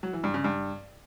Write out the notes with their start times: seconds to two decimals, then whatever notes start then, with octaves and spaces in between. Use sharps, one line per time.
0.03 F#3
0.13 E3
0.24 G2
0.34 C#3
0.44 G2